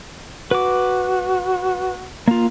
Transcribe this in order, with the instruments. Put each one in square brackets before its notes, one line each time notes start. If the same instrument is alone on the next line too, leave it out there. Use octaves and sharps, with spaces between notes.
[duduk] F#4 [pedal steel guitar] B4 D6
[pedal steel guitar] A#3 F4